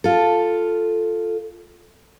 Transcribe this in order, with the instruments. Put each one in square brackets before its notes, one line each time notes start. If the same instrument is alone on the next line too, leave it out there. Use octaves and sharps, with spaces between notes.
[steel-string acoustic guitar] F4 A4